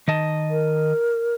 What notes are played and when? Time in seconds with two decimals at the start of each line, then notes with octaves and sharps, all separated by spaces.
0.08 D#3 D#5 A5
0.51 A#4